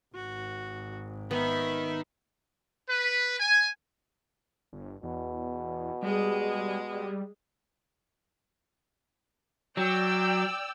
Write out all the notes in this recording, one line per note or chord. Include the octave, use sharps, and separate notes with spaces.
G#1 F#4
D#3 B3 E5 B5
B4
G#5
G1
E2 B2
G3 G#3 G#4
G3
F#3 D5 G5 E6